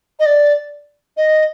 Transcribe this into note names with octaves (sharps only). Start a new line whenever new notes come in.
D#5
D5
D#5